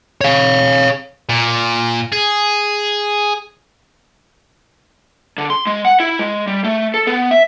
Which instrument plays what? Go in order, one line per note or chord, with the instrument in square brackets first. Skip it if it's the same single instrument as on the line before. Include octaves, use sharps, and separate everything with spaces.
[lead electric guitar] C#5 F5
[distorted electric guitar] A#2
G#4
[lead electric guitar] D3
C6
G#3
F#5
E4
G#3
G3
A3
A4
B3
E5